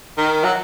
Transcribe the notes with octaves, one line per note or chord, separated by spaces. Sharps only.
D#3
F#3